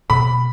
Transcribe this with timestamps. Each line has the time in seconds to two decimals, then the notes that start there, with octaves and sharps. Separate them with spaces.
0.10 B2 B5